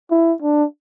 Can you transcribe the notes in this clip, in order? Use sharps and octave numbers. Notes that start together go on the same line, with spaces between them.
E4
D4